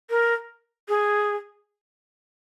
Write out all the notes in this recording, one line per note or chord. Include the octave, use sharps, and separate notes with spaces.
A#4
G#4